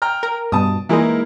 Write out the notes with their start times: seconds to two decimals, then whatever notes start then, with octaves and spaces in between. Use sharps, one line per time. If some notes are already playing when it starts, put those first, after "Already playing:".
0.02 G5 A#5 F6
0.23 A#4
0.52 G2 B2 A5 D#6
0.89 E3 G#3 A#3 D#4 E4 A#4